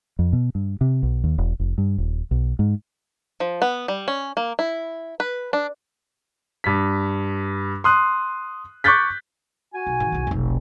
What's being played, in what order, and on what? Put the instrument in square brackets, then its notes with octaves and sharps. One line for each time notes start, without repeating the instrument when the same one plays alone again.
[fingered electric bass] F2
B2
G2
C3
B1
D#2
E1
F1
G2
D#1
B1
G#2
[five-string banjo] F3
B3
G3
C#4
A#3
E4
B4
D4
[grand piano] G2 B6
C6 D#6 F#6
C#6 D6 F#6 G6 A6 B6
[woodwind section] F#4 G#5
[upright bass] B1
G#2 D#3
B1 E2
F1 B1